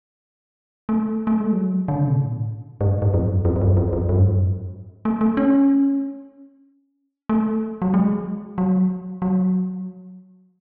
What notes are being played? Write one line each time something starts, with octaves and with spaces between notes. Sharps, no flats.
A3
A3
G#3
F#3
D3
C#3
B2
A2
G#2
G#2
F2
F#2
F2
F2
F#2
F2
F2
F#2
G#2
F#2
A3
A3
C#4
A3
F#3
G#3
F#3
F#3